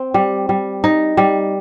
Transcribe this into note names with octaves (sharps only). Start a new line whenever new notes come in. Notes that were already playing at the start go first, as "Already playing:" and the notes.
Already playing: C4
G3
G3
D#4
G3